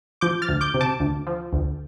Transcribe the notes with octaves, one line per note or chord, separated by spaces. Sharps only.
F3 D6 G6
F6 A6
D2
D6 G6
C3
A5 D6
D2
F3
D2